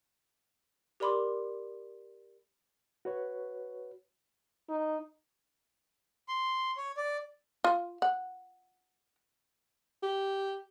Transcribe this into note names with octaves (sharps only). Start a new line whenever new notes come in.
G4 A#4 D5 B5 C6 D6
F#4 B4 C#5
D#4
C6
C#5
D5
F4
F#5
G4